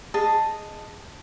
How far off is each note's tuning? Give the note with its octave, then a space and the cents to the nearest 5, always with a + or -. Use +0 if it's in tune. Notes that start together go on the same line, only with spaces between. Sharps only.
G#4 +0 D#5 -5 A5 +0